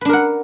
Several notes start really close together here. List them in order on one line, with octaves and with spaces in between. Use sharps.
B4 D4 A#4 F#5